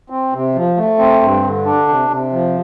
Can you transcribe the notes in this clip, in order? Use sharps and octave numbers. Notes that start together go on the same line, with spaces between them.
C4
C3
F3
A3
C4
G2
D3
D4
C3
C3
F3